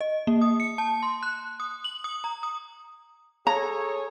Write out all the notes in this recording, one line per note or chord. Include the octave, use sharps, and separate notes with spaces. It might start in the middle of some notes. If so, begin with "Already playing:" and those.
D#5
A#3
D#6
C#7
A5
C6
F#6
D#6
F#7
D#6
A#5
D#6
G#4 A4 C#5 A#5